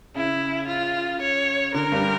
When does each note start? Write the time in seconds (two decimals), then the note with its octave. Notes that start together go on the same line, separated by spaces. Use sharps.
0.15 C#3 E4
0.68 F4
1.22 C#5
1.74 D3 A#4
1.92 G2 G3